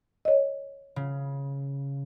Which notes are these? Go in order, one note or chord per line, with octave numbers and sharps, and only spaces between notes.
C#5 D#5
C#3